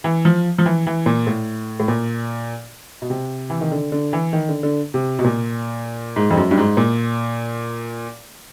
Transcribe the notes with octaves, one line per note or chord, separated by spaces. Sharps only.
E3
F3
F3
E3
E3
A#2
A2
A2
A#2
B2
C3
E3
D#3
D3
D3
E3
D#3
D3
D3
C3
B2
A#2
G#2
F2
F#2
G2
G#2
A#2